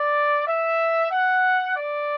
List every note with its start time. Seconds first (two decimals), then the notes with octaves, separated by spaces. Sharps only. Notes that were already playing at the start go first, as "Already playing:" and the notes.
Already playing: D5
0.46 E5
1.11 F#5
1.76 D5